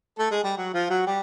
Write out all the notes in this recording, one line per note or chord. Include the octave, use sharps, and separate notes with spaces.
A3 A4
G#3 G#4
G3 G4
F#3 F#4
F3 F4
F#3 F#4
G3 G4